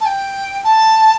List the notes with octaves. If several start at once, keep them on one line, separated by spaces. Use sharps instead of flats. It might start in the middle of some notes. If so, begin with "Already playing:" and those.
A5
G5
A5